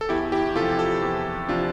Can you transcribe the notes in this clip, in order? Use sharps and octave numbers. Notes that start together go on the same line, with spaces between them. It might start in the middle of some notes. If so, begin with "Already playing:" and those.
A4
E2 E4 G4
E4 G4
C3 F3 F4 A4
F4 A4
E2
C3 F3 D4 F4